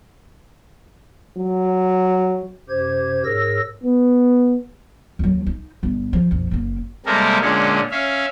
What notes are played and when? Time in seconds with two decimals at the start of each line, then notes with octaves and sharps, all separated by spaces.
1.37 F#3
2.69 F#2 C3 G4 C5 G#6
3.24 G#2 G#4 A#4 C#5 E6 A#6
3.84 B3
5.19 D#2 F#3
5.47 D#4
5.83 G1
6.13 F3
6.31 A#1 F2
6.51 F#1 A#3
7.06 C3 G3 G#3 A#3 A4 A#4
7.41 A#2 D3 G#3 C#4
7.91 C#4 E5 F5